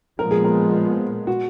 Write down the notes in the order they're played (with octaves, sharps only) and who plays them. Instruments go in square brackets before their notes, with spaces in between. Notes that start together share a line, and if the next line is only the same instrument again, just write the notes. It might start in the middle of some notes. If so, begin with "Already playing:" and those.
[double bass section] A#2 F3 G#3 B3 [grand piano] A#4
[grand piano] G#4
A#4
F#4